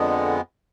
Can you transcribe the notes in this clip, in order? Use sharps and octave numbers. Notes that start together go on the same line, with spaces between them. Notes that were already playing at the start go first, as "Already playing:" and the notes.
Already playing: F2 D3 G#3 B3